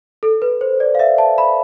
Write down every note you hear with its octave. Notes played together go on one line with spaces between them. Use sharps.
A4
B4
C5
D5
F5
E5
A5
B5